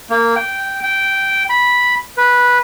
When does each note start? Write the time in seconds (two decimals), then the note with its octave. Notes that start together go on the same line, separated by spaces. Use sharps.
0.10 A#3
0.36 G5
0.83 G5
1.50 B5
2.17 B4